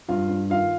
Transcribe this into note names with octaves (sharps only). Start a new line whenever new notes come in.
G2 F4 F5
G2
D#3 F4 F5